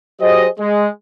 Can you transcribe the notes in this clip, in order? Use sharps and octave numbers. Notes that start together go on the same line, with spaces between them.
F#3 G4 G#4 C5 D#5
G#3